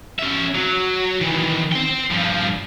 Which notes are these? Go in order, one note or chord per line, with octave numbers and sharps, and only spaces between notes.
C#4 E5
F#3
D#3 E3
C5 G5
G2 F3